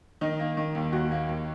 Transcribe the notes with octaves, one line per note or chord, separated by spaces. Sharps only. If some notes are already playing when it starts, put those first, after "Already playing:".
D#3 D#4
A#3
D#3
D#2
D#2 F#4
A#3
D#2